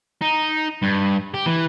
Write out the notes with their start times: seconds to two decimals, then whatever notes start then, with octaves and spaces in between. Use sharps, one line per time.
0.22 D#4
0.83 G2
1.34 G4
1.46 E3